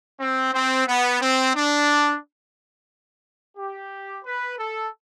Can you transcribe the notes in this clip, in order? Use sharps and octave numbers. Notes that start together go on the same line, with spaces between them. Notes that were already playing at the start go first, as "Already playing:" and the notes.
C4
C4
B3
C4
D4
G4
B4
A4